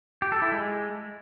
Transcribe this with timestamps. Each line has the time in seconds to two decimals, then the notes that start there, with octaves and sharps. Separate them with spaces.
0.22 G4
0.32 A4
0.42 E4
0.52 G#3